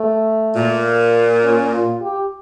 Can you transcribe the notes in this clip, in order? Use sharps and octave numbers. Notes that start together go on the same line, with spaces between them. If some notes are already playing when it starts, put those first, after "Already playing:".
Already playing: A3
A#2
C#4
F4
G4